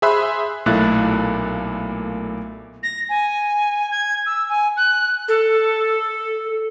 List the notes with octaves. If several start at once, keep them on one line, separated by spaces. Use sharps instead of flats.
G#4 C5 E5 B5 C6 F#6
B1 A#2 A3 E4 F#6 A6
A#6
G#5
G#6
E6
G#5
F#6
A4